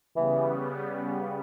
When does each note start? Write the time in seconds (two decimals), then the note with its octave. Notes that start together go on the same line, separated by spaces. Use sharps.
0.16 C#3 E3 G3 B3